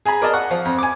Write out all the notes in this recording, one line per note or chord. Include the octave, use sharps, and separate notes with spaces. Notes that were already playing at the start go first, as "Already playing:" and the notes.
G#4 G#5 A#5 B5
A#4 D5 D#5 A5 D#6
F#5 C#6
F3
F2
G#5 D6